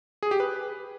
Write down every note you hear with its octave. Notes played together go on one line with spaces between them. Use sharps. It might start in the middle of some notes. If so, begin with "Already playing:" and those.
G#4
G4
B4